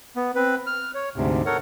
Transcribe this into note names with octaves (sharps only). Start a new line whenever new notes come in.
B3
C4 B4
F6
C#5
D2 G#2 C3
A4 A#4 C#5 F#5